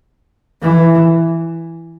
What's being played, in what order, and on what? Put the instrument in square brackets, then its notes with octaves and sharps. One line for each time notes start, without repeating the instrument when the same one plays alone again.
[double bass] E3